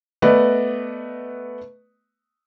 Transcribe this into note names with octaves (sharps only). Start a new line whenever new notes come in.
A3 B3 B4 D5 D#5